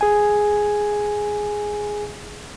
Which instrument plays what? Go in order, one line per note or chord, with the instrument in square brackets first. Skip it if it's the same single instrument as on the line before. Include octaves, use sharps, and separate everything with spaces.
[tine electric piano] G#4 G#5